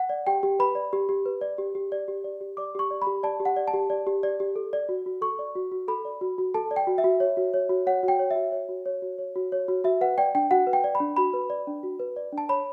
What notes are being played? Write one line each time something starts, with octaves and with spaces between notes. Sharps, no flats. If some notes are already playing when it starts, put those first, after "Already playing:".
Already playing: F#5
D5
G4 G5
G4
B4 B5
D5
G4
G4
B4
D5
G4
G4
D5
G4
D5
G4
D5 D6
G4 C#6
D5
B5
G4
D5 A5
G4
F#5
D5
A5
G4
D5
G4
D5
G4
A4
D5
F#4
F#4
A4 C#6
D5
F#4
F#4
A4 B5
D5
F#4
F#4
A4 A5
D5
G5
F#4
E5
F#4
C#5
F#4
C#5
F#4
C#5 F#5
F#4
G5
C#5
F#4 E5
C#5
F#4
C#5
F#4
C#5
F#4
C#5
F#4
F#4 E5
B4 F#5
D5 G5
D4 G5
F#4 F#5
B4
G5
D5
B5
D4
F#4 B5
B4
D5
D4
F#4
B4
D5
D4
A5
C#5 B5